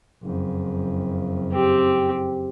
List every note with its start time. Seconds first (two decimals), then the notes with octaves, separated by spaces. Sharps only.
0.23 F#1 F2
1.53 C4 G4